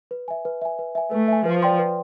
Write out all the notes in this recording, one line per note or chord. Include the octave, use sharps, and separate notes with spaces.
B4
E5 G#5
B4
E5 G#5
B4
E5 G#5
A3 B4
E5 G#5
F3 B4
D5 G5 C6
B4